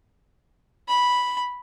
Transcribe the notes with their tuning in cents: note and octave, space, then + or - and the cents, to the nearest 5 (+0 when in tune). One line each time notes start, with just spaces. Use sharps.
B5 -5